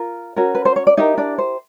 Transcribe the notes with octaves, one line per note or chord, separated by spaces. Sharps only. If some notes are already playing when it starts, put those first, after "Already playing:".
Already playing: F4 A#4
C#4 F#4 A#4
B4
C5
C#5
D5
D#4 E4 G4 A#4 D#5
D4 D5
C5